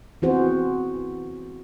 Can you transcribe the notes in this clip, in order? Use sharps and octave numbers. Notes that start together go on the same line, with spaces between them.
E3 B3 C4 F#4 G#4 C5